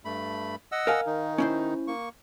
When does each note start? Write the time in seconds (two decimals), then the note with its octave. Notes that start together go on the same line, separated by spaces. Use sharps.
0.05 G2 A3 B5
0.72 D#5 F#5 E6
0.87 A#4 F5 G#5
1.06 D#3 D#4
1.38 C#4 E4 C5
1.87 A#3 C#6